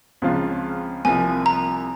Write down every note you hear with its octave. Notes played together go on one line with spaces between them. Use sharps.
C#2 C#3 F3 C4 F4
C2 C3 F3 A#3 G#5
A#5